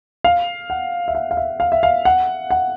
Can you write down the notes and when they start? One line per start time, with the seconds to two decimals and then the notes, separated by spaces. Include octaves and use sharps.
0.24 F5
0.70 F#5
1.08 E5
1.15 F5
1.31 F5
1.37 E5
1.60 F5
1.72 E5
1.83 F5
2.05 F#5
2.50 F#5